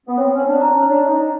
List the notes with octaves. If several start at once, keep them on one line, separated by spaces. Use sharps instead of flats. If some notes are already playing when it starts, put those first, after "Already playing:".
B3
C4 C#5
C#4
C#5
D4
D4 A#5
C#4
C#5
D4
D#4 C#5